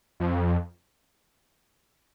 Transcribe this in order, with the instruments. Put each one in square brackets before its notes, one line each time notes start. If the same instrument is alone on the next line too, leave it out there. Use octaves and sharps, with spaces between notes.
[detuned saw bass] F2